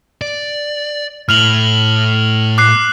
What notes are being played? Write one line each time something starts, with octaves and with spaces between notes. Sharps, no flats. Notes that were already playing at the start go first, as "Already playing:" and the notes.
D5
A2 F6 F7 F#7
D6 F#6 C7